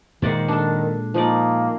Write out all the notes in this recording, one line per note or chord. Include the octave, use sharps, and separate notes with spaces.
A#2 D#3 G#3 C5 D5 F#5
D4 A4
F3 A#3 D#4 D5